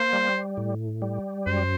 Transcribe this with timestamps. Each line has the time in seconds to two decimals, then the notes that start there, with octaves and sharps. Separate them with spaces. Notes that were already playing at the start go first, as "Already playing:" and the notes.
Already playing: A#3 C5
0.13 G3
0.57 A2
1.02 G3
1.46 F#2 C5